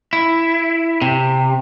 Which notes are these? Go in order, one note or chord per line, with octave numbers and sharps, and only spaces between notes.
E4
C3